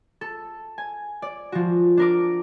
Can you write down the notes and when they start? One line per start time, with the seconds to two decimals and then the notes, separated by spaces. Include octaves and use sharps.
0.21 A4
0.78 G#5
1.22 D5
1.52 F3 F#4
1.97 D4 A#4 D6